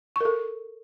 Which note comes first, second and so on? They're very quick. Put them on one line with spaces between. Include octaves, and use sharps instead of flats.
C#6 A#4 A4